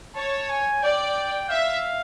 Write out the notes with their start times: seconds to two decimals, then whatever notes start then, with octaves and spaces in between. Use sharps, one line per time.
0.16 C#5 A5
0.49 G#5
0.83 D5 G5
1.49 E5 F5